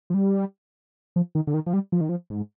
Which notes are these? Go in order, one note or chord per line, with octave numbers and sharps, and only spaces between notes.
F3
G3
F3
D#3
D3
D#3
F3
G3
F3
D#3
F3
G#2